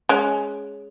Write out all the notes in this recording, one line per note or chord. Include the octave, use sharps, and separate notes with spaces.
G#3 C#4